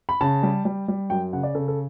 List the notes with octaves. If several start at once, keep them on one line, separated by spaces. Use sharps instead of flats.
B5
C#3 A5
G3
G3
G3
F#2 G5
C#3 F#5
D5
C#3 A4
A4